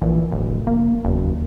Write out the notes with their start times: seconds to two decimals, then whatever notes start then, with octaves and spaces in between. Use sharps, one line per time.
0.01 A#1 E3
0.31 D1 G#1
0.45 F1
0.67 A#3
1.05 F#1 E2
1.24 D#2